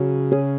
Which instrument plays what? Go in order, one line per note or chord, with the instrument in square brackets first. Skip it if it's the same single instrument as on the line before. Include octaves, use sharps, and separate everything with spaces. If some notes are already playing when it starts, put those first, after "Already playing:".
Already playing: [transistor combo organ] C#3 [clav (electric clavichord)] F#3
[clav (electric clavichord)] C#4 G#4